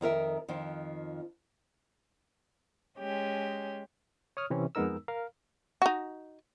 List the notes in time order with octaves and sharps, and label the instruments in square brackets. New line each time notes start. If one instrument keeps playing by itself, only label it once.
[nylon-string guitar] F2 D#3 A#4 E5
F2 D#3 F3
[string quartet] G#3 C#4 G4
[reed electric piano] C#5 D#6 F6
C3 E3 C4 C#4
F2 G#3 B3 D#4 A#4 E6
A#4 F5
[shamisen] D#4 F#4